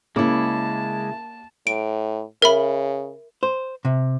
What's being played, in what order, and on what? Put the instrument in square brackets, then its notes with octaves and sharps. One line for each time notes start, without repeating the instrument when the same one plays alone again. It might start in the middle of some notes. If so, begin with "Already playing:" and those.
[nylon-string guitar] C#3 E4 [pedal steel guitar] G#3 D6 [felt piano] A#3 [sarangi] A5
[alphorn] A2 [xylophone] D7
[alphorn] C#3 [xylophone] A#4 E5 B5
[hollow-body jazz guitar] C5
C3